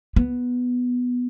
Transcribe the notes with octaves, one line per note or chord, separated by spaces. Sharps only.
B3